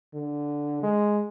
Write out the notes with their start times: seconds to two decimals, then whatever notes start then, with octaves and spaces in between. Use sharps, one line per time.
0.14 D3
0.82 G#3